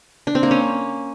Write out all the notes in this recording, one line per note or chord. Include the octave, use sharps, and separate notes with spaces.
D4
C4
A#3
C#4